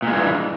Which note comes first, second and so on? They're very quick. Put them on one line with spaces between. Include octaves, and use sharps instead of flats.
A#2 G#3 G2 E3